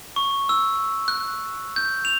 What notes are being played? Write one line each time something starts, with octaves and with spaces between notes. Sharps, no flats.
C#6
E6
F#6
G6
F7